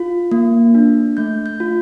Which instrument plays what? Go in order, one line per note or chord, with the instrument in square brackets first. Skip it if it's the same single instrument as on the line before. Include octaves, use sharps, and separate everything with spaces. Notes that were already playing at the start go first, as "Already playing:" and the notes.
Already playing: [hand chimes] F4
A#3
D4
A3 G6
G6
F4